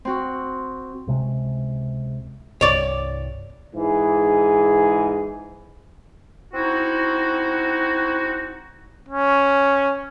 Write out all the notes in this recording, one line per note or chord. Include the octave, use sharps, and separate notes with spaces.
C4 F#4
C#2 C3 G#3
C2 G2 C#5 D5
G#2 E3 G#4
C4 D#4 E4 F#4
C#4